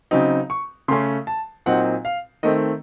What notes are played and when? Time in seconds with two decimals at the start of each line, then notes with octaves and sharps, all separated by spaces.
0.11 C#3 F#3 C4 D#4
0.50 C#6
0.88 C#3 A3 C#4 C6
1.27 A5
1.66 A#2 F#3 C4 D#4 F#5
2.05 F5
2.43 D#3 A3 C4 D#5